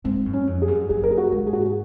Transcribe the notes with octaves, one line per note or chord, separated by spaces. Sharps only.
G#2 C4
F#2
C#4
F2
G#4
F#2
F#2 G#4
A#4
G#4
F#4
G#2
G#4
F#4
G#4